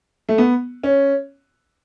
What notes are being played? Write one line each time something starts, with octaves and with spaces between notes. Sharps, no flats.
A3
B3
C#4